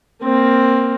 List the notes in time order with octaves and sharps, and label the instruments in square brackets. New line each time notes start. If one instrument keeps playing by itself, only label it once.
[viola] A#3 C4